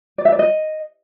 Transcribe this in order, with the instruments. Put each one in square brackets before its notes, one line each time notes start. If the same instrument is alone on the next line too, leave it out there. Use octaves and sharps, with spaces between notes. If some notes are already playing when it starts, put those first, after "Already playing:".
[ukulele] D5
E5
D5
D#5